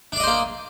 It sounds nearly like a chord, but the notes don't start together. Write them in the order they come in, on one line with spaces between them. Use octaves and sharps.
D4 D5 D#5 C5 A#3